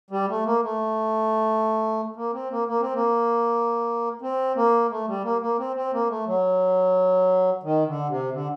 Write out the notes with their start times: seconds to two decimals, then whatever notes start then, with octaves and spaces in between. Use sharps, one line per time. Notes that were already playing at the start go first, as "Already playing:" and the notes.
0.11 G3
0.29 A3
0.45 A#3
0.63 A3
2.16 A#3
2.33 C4
2.51 A#3
2.68 A#3
2.81 C4
2.94 A#3
4.22 C4
4.56 A#3
4.90 A3
5.07 G3
5.24 A#3
5.42 A#3
5.59 C4
5.76 C4
5.93 A#3
6.09 A3
6.27 F#3
7.63 D#3
7.87 D3
8.09 C3
8.32 D3